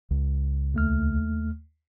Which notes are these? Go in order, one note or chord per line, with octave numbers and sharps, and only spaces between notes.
C#2
D#2 A3 F6